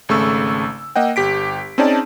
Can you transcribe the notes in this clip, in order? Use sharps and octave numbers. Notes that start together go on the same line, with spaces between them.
G#1 C#3 A3 C#6 E6
A#3 D#5 F#5 G5
G1 G4 B6 D7
C4 C#4 D#4 G#4 D5 A5